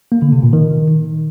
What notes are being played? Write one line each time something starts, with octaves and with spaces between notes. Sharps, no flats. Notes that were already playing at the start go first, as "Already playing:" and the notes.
A#3
D3
C3
A#2
D#3